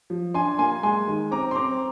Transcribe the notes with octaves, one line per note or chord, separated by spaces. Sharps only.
F3
D4 G#5 C6
A#3 G#5 C6
G#3 G#5 C6
D#3
C4 A#5 D6
C6
C4 A#5 D6